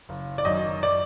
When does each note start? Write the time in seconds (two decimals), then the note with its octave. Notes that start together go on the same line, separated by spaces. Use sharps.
0.09 F#1
0.38 D5
0.45 F#2 D#3 D#5
0.83 D5